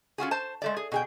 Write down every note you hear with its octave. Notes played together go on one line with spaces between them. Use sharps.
C#4 F4 F#4 G#4
C5 A5
G#3 A3 D5
G#4
B2 G#4 G5